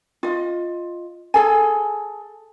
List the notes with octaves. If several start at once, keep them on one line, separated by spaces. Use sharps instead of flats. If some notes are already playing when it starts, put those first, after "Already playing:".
F4 D#5
G#4 A4 G#5